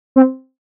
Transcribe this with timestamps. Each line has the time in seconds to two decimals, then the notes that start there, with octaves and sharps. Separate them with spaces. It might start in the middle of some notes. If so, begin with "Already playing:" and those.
0.16 C4